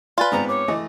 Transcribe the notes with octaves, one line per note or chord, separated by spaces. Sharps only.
F4 B4 D5 G#5 C6 A6
G#2 B3 C4 A#5
C#5 D6
E3 A3 D#5